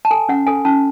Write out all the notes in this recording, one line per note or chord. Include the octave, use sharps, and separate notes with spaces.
A5
A4 G#5
C#4 F#5
A4 G#5
C#4 A5